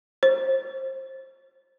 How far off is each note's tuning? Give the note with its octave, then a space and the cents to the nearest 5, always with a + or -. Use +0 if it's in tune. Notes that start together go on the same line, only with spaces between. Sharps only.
C5 +20